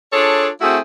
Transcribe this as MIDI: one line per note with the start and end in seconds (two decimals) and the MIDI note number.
0.13 0.48 62
0.13 0.48 65
0.13 0.48 68
0.13 0.48 69
0.13 0.48 73
0.61 0.77 57
0.61 0.77 60
0.61 0.77 64
0.61 0.77 66
0.61 0.77 68
0.61 0.77 76